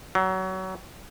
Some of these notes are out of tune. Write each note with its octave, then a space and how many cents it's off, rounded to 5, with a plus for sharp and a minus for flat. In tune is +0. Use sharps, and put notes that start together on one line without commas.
F#3 +25